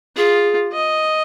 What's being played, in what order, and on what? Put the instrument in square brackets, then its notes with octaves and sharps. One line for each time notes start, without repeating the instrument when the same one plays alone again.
[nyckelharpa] F4 [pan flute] G#4
[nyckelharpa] D#5